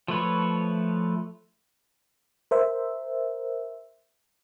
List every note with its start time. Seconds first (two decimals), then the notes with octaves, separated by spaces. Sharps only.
0.08 F3 A3 B4 C#5
2.51 A#4 C5 E5